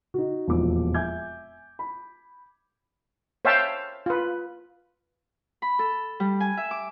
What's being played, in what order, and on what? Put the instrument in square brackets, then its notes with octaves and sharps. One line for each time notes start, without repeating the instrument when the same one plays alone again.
[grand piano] D#4 F#4
E1 F2 A#2 D6
E5 G#5 D6 G6 G#6
B5
[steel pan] C5 C#5 E5 F5 G5 A5
F4 B4
[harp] B5
A4
G3
G#5
E5
D6